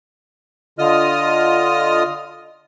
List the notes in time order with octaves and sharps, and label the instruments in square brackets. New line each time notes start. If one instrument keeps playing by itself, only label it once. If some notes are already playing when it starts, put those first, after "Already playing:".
[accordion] D3 F4 D#5 D#6 F6